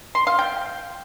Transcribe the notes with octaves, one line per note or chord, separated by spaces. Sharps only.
C6
F5
G5